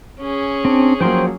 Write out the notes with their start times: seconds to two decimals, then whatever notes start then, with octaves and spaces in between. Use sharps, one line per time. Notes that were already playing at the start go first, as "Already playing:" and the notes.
0.20 C#4 G#4
0.65 C4 D4
1.00 F3 F#3 A#3 C5 G5 C6